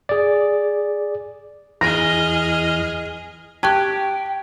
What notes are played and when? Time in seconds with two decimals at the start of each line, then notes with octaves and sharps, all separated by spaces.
0.09 G#4 D5
1.81 E2 G#4 D#5 F6 A#6
3.63 G4 G5 A5 C#6 F#6 G#6